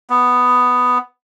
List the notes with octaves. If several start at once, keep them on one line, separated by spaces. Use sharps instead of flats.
B3